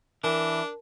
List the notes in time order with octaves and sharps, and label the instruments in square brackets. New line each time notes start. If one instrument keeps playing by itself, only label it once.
[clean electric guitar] E3 [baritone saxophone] D4 [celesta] A#4 A5